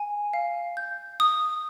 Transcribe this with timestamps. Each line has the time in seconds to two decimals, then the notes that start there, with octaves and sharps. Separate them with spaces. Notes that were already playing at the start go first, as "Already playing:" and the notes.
Already playing: G#5
0.34 F5
0.77 G6
1.20 D#6